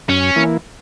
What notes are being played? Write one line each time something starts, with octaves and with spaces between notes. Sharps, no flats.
F#2 C#4
E3 A#3 E4